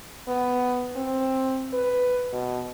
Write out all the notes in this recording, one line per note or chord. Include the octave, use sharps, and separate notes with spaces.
B3
C4
B4
B2